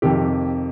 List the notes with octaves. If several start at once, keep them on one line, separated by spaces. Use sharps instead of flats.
F2 C3 D#3 G4